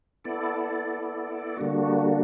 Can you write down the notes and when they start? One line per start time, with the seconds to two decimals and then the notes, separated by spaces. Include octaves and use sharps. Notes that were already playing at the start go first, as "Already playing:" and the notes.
0.25 B3 E4 A4 D5
1.57 D3 G3 A#3 D4 F#4